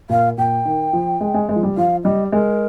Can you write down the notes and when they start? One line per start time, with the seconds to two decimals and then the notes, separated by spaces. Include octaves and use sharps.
0.09 A#2 F5
0.38 A#2 G5
0.65 D#3
0.93 F3
1.21 G#3
1.34 G#3
1.49 G#3
1.56 F3
1.63 G3
1.77 F3 F5
2.04 G3 D#5
2.32 G#3 A#4